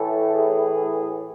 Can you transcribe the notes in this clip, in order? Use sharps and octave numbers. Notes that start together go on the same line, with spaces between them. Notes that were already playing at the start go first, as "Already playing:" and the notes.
Already playing: A2 E3 A3 A4
G#4